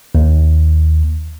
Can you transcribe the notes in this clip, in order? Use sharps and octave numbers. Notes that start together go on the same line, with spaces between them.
D#2